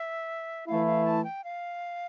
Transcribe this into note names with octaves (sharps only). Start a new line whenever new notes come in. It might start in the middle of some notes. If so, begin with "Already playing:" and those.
Already playing: E5
E3 A3 E4 F5
F5
A5
G5
F5